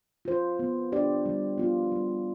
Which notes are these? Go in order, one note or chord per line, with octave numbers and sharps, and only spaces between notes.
F4 C5
B3
D4 G4 D5
G3
B3 F4
G3